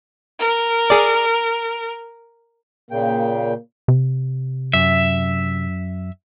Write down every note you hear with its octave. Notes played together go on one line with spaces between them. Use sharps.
A#4
G#4 D5
A#2 C#3 A#3 G5
C3
F#2 E5